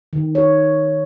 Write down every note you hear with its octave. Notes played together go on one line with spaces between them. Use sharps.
D#3
C#5